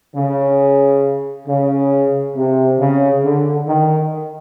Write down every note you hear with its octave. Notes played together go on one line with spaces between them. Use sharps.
C#3
C#3
C3
C#3
D3
D#3